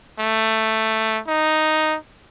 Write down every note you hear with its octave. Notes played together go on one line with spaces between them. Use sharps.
A3
D#4